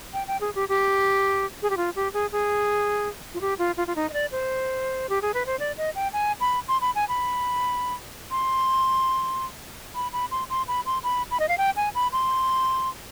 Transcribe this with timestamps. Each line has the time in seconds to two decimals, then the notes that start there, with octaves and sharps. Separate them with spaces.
0.14 G5
0.27 G5
0.41 G#4
0.55 G4
0.69 G4
1.62 G#4
1.70 G4
1.77 F4
1.96 G4
2.13 G#4
2.32 G#4
3.34 F4
3.41 G4
3.59 F4
3.77 F4
3.87 F4
3.96 D#4
4.10 D#5
4.13 D5
4.32 C5
5.09 G4
5.22 G#4
5.34 B4
5.46 C5
5.59 D5
5.77 D#5
5.95 G5
6.13 G#5
6.40 B5
6.68 C6
6.81 B5
6.95 G#5
7.09 B5
8.31 C6
9.95 B5
10.13 B5
10.31 C6
10.50 C6
10.68 B5
10.86 C6
11.04 B5
11.31 B5
11.40 D#5
11.49 F5
11.58 G5
11.76 G#5
11.95 B5
12.13 C6